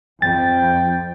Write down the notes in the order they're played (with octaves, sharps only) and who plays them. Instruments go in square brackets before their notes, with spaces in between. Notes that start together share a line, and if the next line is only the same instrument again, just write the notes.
[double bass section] F2 [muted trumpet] G5 [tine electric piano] A6